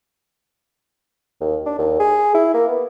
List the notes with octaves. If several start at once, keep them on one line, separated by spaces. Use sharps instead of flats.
D#2
D4
D#2
G#4
E4
A#3
B3